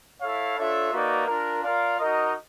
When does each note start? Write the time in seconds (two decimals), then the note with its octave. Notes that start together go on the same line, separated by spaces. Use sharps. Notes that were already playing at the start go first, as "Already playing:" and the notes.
0.21 E4 A4 C#5 F5
0.57 D4 F4 A4 C#5 E5
0.92 A#3 D#4 F#4 B4 D5
1.27 D4 F4 A#4
1.63 F4 A#4 D5 F5
1.97 D#4 F#4 A#4 D#5